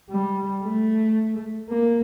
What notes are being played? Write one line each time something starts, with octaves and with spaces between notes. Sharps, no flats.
G3
A3
A#3